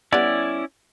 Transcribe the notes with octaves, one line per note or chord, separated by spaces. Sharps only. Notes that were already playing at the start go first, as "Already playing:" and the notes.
G3 B3 C#4 E4 D5